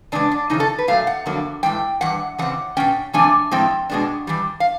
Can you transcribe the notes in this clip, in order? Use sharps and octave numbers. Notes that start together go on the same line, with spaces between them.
E2 C#3 G#3 B3 D4
D4
F2 C#3 E3 D#4
A4
B4
A#2 F#3 A3 F5
F#5
F2 D3 F#3 A#3
A2 E3 G#3 G5
G2 E3 F#5
C#3 E3 C4 F#5
B2 G#3 C#4 G5
E2 C3 F3 A3 D4 G#5
A2 F3 G#3 C4 G5
B2 G#3 B3 D4
G2 E3 G3
F5